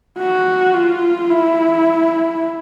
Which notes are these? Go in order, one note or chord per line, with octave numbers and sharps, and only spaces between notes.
F#4
F4
E4